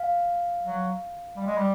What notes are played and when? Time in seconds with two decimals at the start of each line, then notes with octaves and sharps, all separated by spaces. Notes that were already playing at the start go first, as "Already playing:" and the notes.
Already playing: F5
0.64 F#3
1.36 G3
1.46 G#3
1.57 G3